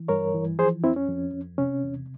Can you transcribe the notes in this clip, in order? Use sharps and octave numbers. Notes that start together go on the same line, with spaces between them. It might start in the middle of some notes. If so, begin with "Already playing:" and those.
Already playing: E3
G2 A#4 C#5
E3
F3 G#4 C5
F2 C4 E4
C#4
F2
F2
C3 C#4
E2